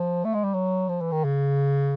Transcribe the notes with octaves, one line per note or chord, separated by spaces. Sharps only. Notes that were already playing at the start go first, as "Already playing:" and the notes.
Already playing: F3
A3
G#3
G3
F#3
F3
E3
D#3
C#3